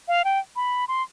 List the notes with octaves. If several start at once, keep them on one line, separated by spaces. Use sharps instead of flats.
F5
G5
B5
C6